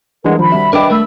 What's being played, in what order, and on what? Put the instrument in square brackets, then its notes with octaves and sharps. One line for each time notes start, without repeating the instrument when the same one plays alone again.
[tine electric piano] E3 G#3 [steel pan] G3 D4 [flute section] A#4 D#5 F#5
[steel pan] D#3 [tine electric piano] F3 [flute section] B5
[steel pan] G3 C4 F#4 [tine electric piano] E5
[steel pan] D4 [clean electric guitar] A#4 B4 G5 [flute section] D#5 B5 D6
[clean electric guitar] A3 A#4 [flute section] B5 E6